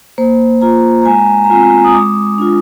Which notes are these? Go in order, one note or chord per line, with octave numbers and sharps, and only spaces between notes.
A#3 C5
F4 A#5
A#5
G#3 G#5
A#5
C4 F4 G#5
D#6
G#3 D6
D4 F4